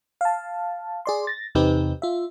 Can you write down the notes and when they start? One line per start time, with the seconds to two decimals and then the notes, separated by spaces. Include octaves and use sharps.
0.21 F5 A5
1.05 G#4 D5 C6
1.27 A6 A#6
1.55 E2 C3 C4 D#4 G4 B4
2.02 F4 E5